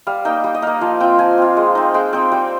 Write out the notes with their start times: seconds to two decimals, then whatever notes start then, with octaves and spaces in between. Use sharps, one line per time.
0.07 G3 F5
0.25 A#3 D#4 G5
0.44 G3 G5
0.55 D#5
0.62 A#3 D#4 F5
0.81 F3 F5
1.00 C4 F4 G5
1.19 F3 G#5
1.38 C4 F4
1.57 G#3
1.75 C4 D#4
1.94 G#3 G5
2.13 C4 D#4 G5
2.32 G3 G5